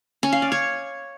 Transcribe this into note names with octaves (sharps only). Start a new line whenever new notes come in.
C#4
F5
D5
C#5